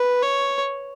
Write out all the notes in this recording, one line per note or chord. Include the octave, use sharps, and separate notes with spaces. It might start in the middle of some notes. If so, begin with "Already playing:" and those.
Already playing: B4
C#5